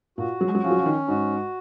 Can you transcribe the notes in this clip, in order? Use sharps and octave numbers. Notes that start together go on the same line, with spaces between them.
A#2 F#4
F#3
G#3
F#3
F3 C#4
F#3
F3
D#3
G#2 F#4